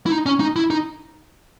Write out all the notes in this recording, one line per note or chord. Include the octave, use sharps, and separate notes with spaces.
E4
D#4
C#4
D#4
E4
D#4